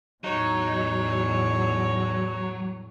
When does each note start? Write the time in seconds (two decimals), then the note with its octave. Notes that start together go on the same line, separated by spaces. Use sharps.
0.24 E2 A2 F#3 D#4 C#5